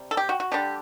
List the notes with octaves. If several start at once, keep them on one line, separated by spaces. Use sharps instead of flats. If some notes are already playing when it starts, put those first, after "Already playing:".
Already playing: C3 G3
A4
G4
F#4
F#4
D3 G3 D4 G4